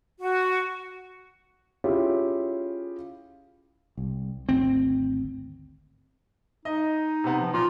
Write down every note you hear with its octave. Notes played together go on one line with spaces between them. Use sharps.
F#4
C#4 E4 F4 G4 G#4 C#5
C2
G#1 D2 C4
D#4 D#5
C3 B3
F3
A#2 F4